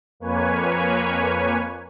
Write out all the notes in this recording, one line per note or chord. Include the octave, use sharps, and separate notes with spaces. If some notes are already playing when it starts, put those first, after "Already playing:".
F2 A#3 B4 C#5 G#5